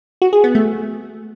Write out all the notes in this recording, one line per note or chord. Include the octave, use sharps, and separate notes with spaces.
F#4
G#4
B3
A3